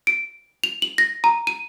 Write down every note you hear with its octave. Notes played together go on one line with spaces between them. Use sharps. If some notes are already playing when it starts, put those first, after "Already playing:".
D7
F7
F#7
A#6
A#5
D#7